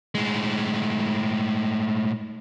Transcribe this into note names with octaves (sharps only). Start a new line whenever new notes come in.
A2 G#3